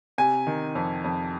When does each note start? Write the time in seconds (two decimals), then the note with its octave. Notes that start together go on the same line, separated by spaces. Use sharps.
0.18 C3 G#5
0.47 D#3
0.75 F2
1.04 F2